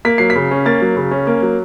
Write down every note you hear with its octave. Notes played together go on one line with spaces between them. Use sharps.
A#3 B6
F#3 C7
B6
C#3
C#4
A#3 A6
F#3
C#3
C#4
A#3
F#3